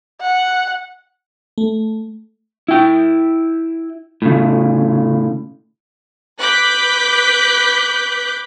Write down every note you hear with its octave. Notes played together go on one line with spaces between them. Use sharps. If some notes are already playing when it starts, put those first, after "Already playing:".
F#5
A3
E4 G5
A2 C#3
B4 D6 F#6 G6 B6